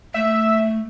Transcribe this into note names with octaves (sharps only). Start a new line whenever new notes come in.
A3 E5